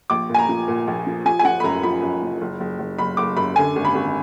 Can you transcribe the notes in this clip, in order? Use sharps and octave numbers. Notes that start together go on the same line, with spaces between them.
A#1 D6
A#2
G#5
A#5
F3
A#2
A#1
F3
F3 G#5
G#5
F3 F#5
B5
F#2 A#5
F3 B5
F#2
F#1
F#1
F#1
F#1
F#1 B5
F#1 D6
F#2 B5
D3 G#5
G#1
B5
G#1